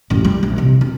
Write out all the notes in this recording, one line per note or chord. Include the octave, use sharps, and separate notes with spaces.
A1 F#2
G3
A#1
C3 E3
E1